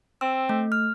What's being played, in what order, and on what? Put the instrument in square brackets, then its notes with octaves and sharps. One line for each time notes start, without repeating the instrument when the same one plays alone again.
[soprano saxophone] C4 [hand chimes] E6
[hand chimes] A3
F6